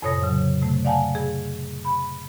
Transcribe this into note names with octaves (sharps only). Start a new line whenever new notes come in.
F2 A2 C3 C#5 D#6 A#6
C#3 F#3
C3 A3
D5 F5 F#5 G#5 A5
G#4
B5